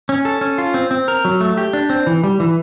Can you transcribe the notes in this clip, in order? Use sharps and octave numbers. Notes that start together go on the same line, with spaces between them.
C#4
A4
C#4
F4
C4
C4
A#4
F#3
A3
G4
D4
C4
E3
G3
E3